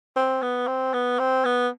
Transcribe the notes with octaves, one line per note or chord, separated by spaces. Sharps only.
C4
B3
C4
B3
C4
B3